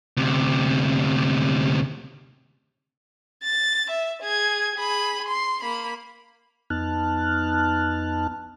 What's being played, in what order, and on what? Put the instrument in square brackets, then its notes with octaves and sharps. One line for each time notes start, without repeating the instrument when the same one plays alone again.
[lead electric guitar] D2 C3
[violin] A6
E5
G#4 G#6
G#4 B5
C6
A#3 B5
[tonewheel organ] F2 B3 D#4 A5 F6 F#6